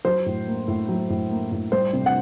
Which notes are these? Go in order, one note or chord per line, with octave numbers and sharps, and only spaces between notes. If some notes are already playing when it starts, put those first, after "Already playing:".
F#3 C5
A2
A#3
A2
F#3
A2
A#3
A2
G3 C5
C3
F#5